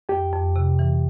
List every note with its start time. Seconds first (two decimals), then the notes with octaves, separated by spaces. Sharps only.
0.09 F2 G4
0.33 F2
0.56 C3
0.79 E3